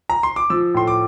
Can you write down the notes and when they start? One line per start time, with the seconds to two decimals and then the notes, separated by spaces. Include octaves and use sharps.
0.09 A#5
0.23 C6
0.36 D6
0.50 F3 E6
0.74 A2 C6
0.87 D6